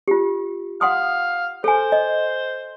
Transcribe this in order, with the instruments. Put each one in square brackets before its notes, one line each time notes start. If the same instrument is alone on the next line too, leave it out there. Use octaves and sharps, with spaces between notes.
[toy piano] F4 G4
[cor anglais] F5 [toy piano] F#5 C6 D#6
[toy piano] A4 G#5 [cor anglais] C5
[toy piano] D#5